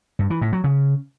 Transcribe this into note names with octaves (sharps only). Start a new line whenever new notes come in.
G2
E3
A2
F#3
C#3